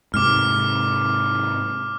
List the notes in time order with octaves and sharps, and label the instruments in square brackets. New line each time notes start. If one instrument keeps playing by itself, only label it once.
[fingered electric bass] G#2 C3 [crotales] D6 F6